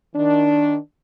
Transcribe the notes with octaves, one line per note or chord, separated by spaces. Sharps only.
D#3 D4